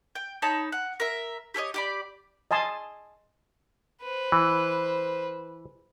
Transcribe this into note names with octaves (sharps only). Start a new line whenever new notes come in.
G5
D#4 C#5 A5 B5
F#5
A#4 E5
G4 A4 C#5 D#5
G4 D5 B5
D#5 G#5 A5 C6 D#6
B4 C5
E3